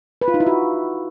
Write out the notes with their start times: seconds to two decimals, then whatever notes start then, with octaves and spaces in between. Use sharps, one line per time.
0.22 B4
0.28 F4
0.34 D#4
0.40 E4
0.47 F#4